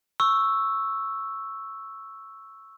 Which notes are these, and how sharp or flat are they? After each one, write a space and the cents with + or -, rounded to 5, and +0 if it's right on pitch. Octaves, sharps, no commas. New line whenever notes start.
C#6 -5 E6 +0